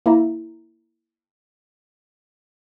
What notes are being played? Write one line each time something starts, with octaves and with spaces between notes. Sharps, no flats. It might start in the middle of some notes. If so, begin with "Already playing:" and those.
A#3 E4 E5 A#5